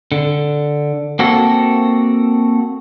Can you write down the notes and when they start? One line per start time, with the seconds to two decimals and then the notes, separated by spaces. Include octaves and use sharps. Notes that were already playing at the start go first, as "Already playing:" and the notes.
0.12 D3
1.19 A#3 C4 F#4 A4